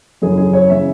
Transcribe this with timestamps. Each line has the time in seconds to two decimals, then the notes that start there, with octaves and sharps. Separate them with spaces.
0.22 F#2 C#3 E3 G#4
0.37 G#4
0.53 C#5
0.70 C#3 E3 E5